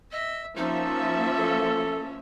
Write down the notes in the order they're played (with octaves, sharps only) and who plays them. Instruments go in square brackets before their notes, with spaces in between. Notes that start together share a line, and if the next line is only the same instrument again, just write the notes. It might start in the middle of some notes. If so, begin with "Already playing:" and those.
[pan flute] D#5 [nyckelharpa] E5
[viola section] F3 A#3 E5 [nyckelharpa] C#4 [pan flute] D#4 [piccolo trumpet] A5
[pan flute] A4